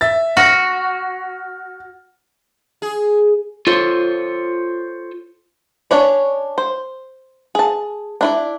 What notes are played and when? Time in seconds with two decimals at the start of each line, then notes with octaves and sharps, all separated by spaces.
0.01 E5 A6
0.37 F#4 F6 A#6
2.82 G#4
3.67 F4 A4 C5 C#5
5.91 C#4 D4 C#5 D5
6.58 C5
7.55 G#4 A5
8.21 D4 E4 D5